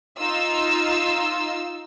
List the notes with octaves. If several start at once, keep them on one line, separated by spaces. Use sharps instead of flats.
D#4 F4 E6